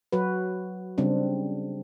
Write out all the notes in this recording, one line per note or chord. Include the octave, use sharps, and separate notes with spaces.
F#3 F#4 B4
C#3 G3 C4 D4